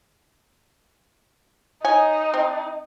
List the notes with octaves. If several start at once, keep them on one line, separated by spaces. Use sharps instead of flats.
D#4 C#5 D#5 G#5
C4